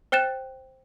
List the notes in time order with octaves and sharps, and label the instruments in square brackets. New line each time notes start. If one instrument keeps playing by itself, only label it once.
[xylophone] C5 G5 F#6 A6 E7